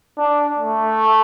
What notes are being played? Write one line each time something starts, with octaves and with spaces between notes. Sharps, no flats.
D4
A3